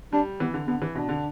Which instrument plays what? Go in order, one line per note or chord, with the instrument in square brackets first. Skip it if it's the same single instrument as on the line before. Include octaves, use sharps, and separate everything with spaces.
[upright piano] G3 [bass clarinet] D4
[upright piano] E3 [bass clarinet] B3
[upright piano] D3
[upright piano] D3 [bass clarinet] B3
[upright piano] E3
[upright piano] B2 [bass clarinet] D4
[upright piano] D3